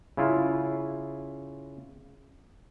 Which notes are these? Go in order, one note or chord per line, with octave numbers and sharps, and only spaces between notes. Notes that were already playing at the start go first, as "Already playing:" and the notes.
C#3 E4 F4